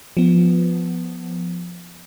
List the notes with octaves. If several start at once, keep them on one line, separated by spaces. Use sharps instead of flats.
F3 B3